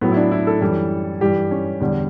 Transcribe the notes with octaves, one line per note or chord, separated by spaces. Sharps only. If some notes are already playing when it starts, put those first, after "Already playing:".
A2 F#3 B3
E4
D4
E4
A4
F#2 E3 G3
G2 E3 G3 G4
C#4
E2 D3 G3